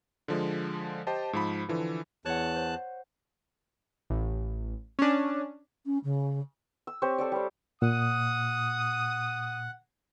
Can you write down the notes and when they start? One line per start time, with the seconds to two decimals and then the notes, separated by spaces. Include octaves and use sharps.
0.28 D3 F3 G#3
1.07 G4 C5 D#5 G5 A5
1.33 G#2 F3 B5
1.69 D3 E3 F3
2.25 E2 C#5 F#5 A5 F#6
2.56 C5
4.10 A1
4.99 C#4 D4
5.86 C#4
6.04 C#3
6.87 E6
7.02 C4 G4 C5 C#5
7.18 A4 C#5 D5
7.32 G3 C5
7.82 A#2 F#5 D#6